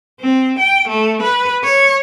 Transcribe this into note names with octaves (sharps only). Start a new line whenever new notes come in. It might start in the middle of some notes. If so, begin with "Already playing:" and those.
C4
G5
A3
B4
C#5